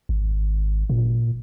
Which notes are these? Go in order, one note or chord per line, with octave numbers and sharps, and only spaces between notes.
G#1
A#2